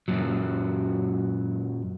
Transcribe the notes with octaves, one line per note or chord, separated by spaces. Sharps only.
F#2 A#2 F#3